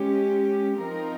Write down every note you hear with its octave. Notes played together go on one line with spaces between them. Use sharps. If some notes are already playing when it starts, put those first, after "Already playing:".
Already playing: G#3 C#4 G4
F3 C4 D#4 A#4